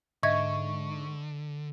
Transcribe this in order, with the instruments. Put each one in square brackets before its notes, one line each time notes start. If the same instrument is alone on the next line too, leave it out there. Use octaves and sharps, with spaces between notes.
[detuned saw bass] G#2 [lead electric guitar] D3 [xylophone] D#5 E5 G#6 [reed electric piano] C#6